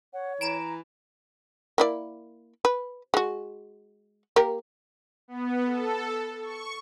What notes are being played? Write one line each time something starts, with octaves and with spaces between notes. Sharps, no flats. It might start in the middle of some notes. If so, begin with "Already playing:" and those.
C#5 F#5
E3 A#5 D7 E7
A#3 E4 D5
B4
G#3 F#4
A#3 G4 A#4
B3
A4
C#6